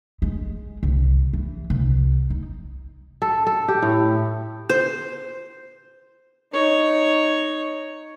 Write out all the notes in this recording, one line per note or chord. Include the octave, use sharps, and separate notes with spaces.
G#3
C2
E3
C2
D#4
A4
A4
G4
A2
C5
D#4 C#5